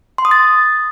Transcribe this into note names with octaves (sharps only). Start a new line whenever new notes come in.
C6
D#6
A6